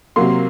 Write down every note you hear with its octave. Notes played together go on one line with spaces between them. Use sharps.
C3 F#3 A#3 C6